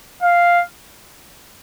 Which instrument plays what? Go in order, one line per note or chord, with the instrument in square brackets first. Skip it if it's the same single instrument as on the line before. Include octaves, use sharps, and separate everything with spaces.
[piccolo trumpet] F5